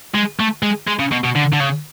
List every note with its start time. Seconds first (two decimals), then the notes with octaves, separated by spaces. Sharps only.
0.15 G#3
0.40 A3
0.63 G#3
0.88 G#3
0.99 C#3
1.12 B2
1.24 B2
1.36 D3
1.53 D3
1.61 C#3